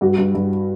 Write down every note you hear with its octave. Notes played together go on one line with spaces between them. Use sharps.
G2 F#4
G2
G2